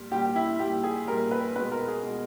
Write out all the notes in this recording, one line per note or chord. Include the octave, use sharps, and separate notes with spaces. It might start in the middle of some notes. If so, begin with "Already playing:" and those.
Already playing: A#2 G3
A#2 G3 G4
G4
E4
A#2 G3 G4
G#4
A#2 G3 A#4
B4
B2 G#3 B4
A#4
G#4
B2 G#3